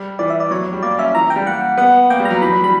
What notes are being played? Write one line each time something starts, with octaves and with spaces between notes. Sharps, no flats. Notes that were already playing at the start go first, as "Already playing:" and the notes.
Already playing: G3
E3 D5
E5
D5
F#3 C#5
F#3
G3
A#3 D5
C#4 E5
E3 A#5
G5
G3
A#3 F#5
B3 F#5
A#3 G5
G3
A#5
F#3
E3 B5
F#3
G3 B5